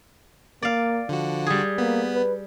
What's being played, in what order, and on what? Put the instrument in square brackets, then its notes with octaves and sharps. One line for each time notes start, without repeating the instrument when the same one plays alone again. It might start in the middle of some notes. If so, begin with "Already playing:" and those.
[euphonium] A#3 [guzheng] D5 F5
[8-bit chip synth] D3 F#4 [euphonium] F3
[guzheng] G3 G#4
[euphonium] A#3 [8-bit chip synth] B3
[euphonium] B4